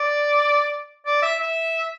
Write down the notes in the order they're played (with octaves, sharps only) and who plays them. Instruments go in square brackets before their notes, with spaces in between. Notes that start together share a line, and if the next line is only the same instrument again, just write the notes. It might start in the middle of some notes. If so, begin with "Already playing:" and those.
Already playing: [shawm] D5
D5
E5
E5